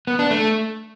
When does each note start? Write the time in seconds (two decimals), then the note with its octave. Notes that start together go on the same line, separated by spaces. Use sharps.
0.07 B3
0.19 D4
0.31 A3